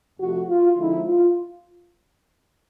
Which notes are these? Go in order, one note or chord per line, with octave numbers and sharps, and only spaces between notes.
F2 C3 F3 A3 F#4
F4
D3 F3 G#3 C4 D#4 E4
F4